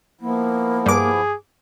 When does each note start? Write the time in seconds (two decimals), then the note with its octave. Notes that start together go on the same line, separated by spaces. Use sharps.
0.21 F3 A#3 B3 E4
0.86 G2 G#4 D6